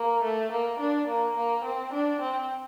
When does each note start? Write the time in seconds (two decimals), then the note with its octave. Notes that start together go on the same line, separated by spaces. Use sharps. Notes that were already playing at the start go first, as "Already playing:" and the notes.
Already playing: A#3
0.23 A3
0.51 A#3
0.80 D4
1.07 A#3
1.36 A#3
1.64 C4
1.92 D4
2.20 C4